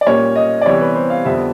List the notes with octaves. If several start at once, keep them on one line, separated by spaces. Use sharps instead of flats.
D5
A#2 G3 A#3 C#4 C#5
D#5
D5
C3 E3 G3 B3 C#5
B4
C5
F5
F2 D3 G3 B3 E5